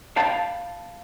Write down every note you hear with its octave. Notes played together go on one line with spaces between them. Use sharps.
F5 G5 A5 B5